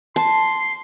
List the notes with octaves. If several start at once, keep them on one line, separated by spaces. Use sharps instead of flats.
A5 C6